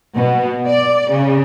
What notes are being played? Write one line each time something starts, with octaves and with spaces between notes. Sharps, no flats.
B2
D5
C#3